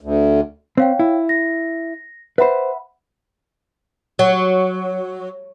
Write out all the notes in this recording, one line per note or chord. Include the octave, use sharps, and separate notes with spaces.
D2
C4 C#5 F5 G5
E4
A#6
B4 C5 E5 F#5 B5
F#3